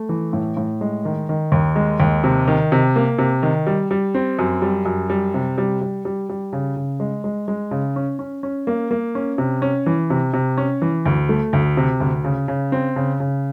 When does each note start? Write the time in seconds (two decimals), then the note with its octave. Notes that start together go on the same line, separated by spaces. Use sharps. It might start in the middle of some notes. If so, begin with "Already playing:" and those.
Already playing: A3
0.09 E3
0.33 A2
0.57 A2
0.81 G#3
1.05 D#3
1.29 D#3
1.52 D#2
1.76 G#3
2.00 D#2
2.24 C3
2.48 D#3
2.72 C3
2.96 A#3
3.18 C3
3.43 D#3
3.67 G3
3.91 G3
4.15 C4
4.39 F#2
4.62 G3
4.85 F#2
5.10 G3
5.34 C3
5.58 G3
5.81 G3
6.05 G3
6.29 G3
6.53 C#3
6.76 C#3
7.00 G#3
7.24 G#3
7.48 G#3
7.71 C#3
7.96 C#4
8.19 C#4
8.43 C#4
8.67 A#3
8.91 A#3
9.15 C#4
9.38 C3
9.62 C#4
9.86 E3
10.10 C3
10.33 C3
10.58 C#4
10.82 E3
11.06 D2
11.29 A3
11.53 D2
11.77 C3
12.00 D2
12.24 C#3
12.48 C#3
12.72 C4
12.96 C#3
13.20 C#3